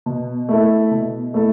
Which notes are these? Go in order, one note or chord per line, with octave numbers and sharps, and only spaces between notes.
B2
A3 E4 A4
B2
A3 E4 A4